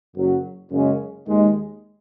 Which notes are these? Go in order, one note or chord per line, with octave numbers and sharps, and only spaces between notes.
F#1 F#2 F#3
F#1 F#2 C#3 G#3 C#4
D#2 D#3 G#3